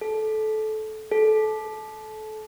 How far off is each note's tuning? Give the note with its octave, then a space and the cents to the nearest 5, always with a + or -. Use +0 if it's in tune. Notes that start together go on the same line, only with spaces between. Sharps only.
A4 -20
A4 -25